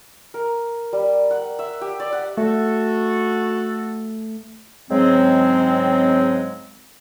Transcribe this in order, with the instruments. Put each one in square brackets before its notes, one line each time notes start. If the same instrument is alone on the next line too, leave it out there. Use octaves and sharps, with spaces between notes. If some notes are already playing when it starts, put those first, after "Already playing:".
[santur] A#4
G3
F#5
E5
G4
D5
F#5
[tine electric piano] A3 [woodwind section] F#4 A4
[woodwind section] G#2 C#3 F#3 G#3 C4